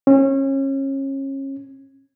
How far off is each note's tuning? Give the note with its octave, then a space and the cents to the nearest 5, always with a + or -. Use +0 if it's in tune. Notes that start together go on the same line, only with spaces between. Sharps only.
C#4 -30